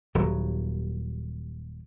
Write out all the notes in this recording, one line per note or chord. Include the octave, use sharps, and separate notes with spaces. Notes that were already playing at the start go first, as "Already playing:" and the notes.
D#1 D#2 F#3